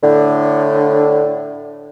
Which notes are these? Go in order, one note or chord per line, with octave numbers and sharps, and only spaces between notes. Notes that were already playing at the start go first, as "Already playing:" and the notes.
A2 D3